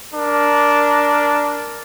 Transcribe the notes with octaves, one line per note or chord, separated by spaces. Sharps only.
D4 A#4